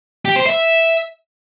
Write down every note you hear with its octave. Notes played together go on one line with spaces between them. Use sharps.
G4
C5
E5